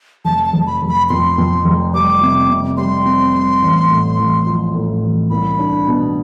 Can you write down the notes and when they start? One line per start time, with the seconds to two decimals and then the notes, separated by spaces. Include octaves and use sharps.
0.25 F1 A5
0.46 A5
0.53 F1
0.67 B5
0.82 F1
0.89 B5
1.09 F2 C6
1.38 F2
1.65 F1
1.94 G3 D6
2.21 C3
2.49 C3
2.77 G3 C6
3.06 C4
3.34 G3
3.62 A1
3.90 A2
4.18 A1
4.46 F3
4.75 A2
5.03 A1
5.30 C2 B5
5.59 D4
5.87 B2